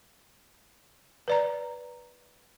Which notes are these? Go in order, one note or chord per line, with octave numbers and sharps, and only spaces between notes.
B4 D5 A#5